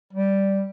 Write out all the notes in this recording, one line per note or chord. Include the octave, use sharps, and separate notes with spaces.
G3